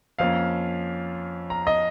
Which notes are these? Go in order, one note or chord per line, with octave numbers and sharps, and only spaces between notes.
F2 F3 A#3 C#4 F5
A#5
D#5